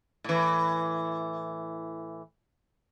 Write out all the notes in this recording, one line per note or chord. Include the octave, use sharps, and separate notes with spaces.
A2 E3